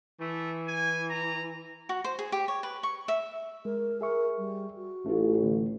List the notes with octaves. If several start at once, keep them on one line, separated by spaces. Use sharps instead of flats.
E3 A3
G#5
A#5
F#4
C5
G#4
G4
C#5
B4
C#6
E5
G#3 A#4
G#4 A#4 E5 C#6
G3
F#4
A1 A3 F4
D3 A3